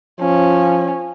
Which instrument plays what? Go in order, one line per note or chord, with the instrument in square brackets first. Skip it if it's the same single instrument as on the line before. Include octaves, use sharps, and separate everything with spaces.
[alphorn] F3 [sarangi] C#4